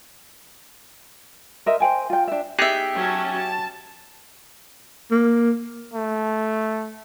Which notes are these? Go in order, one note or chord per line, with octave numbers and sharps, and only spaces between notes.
A#4 C5 D#5 E5
C5 G5 G#5
F4 G5
D4 E5
B3 D#4 G4 G#4 E5
F#3 C#4 A5
A5
A#3
A3